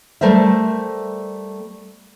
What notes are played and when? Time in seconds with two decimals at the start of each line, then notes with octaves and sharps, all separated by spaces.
0.21 G3 A3 A#4 C5 E5